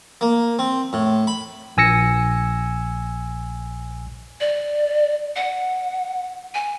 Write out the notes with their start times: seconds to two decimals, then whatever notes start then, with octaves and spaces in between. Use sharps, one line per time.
0.21 A#3
0.59 C4
0.93 A2
1.27 B5
1.77 A#1 G#5 E6 A#6 C#7
4.40 D5
5.36 F#5
6.54 G#5